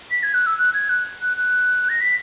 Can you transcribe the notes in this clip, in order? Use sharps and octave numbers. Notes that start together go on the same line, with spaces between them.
B6
G#6
F#6
E6
F#6
G#6
F#6
F#6
F#6
A#6
B6